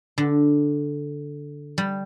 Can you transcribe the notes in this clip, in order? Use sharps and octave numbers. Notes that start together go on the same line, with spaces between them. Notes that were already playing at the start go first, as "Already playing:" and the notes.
D3
G3